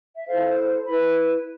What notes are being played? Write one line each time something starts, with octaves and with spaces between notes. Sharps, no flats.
E5
E4 A4 C5 F5
E4 B4 B5